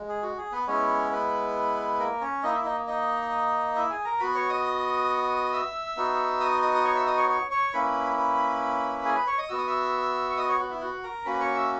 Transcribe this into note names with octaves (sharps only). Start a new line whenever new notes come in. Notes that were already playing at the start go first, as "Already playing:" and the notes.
Already playing: G#3
G#4
F#4
G#4
B3 B4
G#3 B3 C#4 E4 C#5
B3 B4
A#3 A#4
C#4 C#5
A#3 D#4 E4 D#5
E4 E5
D#4 D#5
D#4 D#5
E4 E5
G#4 G#5
A#4 A#5
B3 F#4 B4 B5
C#5 C#6
D#5 D#6
E5 E6
B3 D#4 F#4
D#5 D#6
D#5 D#6
D#6
C#5 C#6
E5 E6
D#5 D#6
C#5 C#6
C#5 C#6
C#5 C#6
A#3 C#4 E4 B4 B5
B4 B5
G#4 G#5
B4 B5
C#5 C#6
D#5 D#6
B3 F#4 E6
D#6
E5 E6
C#6
D#5 D#6
C#5 C#6
F#4 F#5
E4 E5
F#4 F#5
A#4 A#5
A#3 C#4 F#4 B4 B5
C#5 C#6
E5 E6